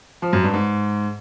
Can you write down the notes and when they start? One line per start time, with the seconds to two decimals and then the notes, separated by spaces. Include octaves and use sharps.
0.22 F3
0.33 F#2
0.43 G2
0.54 G#2